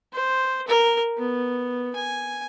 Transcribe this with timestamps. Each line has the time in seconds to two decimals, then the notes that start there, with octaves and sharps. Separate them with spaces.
0.13 C5
0.67 A#4
1.18 B3
1.95 G#5